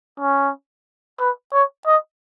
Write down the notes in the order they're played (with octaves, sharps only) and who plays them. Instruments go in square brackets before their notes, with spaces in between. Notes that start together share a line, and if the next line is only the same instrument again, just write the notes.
[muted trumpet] C#4
B4
C#5
D#5